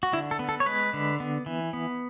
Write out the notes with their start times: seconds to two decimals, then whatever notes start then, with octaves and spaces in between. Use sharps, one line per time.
0.03 F#4
0.13 D3 E4
0.31 A4
0.39 B3
0.49 A4
0.60 C#5
0.66 G#3 B4
0.93 D3
1.20 B3
1.46 E3
1.73 B3